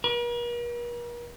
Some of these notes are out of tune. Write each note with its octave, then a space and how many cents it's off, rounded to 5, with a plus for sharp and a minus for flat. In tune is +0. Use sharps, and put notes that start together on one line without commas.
A#4 +45